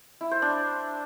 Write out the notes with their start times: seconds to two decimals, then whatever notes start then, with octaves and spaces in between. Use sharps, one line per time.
0.21 E4
0.31 C5
0.42 D4